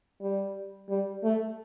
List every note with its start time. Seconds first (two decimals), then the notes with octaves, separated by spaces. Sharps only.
0.21 G3
0.89 G3
1.24 A3